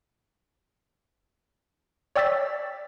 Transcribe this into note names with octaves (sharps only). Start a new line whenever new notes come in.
C#5 D5 G5 E6 A6 B6